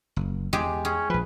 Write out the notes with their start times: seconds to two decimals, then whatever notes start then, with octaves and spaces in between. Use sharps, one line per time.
0.16 F#1
0.53 E2 G#3 G4 G#4
0.85 C#4 G#4
1.10 A#1 F3 B4